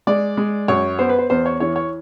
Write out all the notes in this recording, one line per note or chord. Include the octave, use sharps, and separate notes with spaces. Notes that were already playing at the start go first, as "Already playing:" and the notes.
G#3 D5
G#3
F#2 C#5
B3 C5
B4
C5
E2 C5
C#5
E3 C#5
C#5